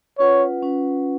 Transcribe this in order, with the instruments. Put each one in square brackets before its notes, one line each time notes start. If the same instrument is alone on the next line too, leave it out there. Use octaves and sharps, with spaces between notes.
[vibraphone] C#4 F4 B4 F#5 [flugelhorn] C#5
[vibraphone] C#4 F4 B4 F#5